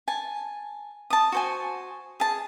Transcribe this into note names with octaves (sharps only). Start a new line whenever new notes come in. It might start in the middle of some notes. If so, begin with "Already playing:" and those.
G#5 A5
A5 D#6
F#4 C5 G#5
G#4 A5